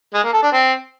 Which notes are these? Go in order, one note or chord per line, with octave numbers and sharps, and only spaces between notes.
G#3
A#3
A4
D4
C4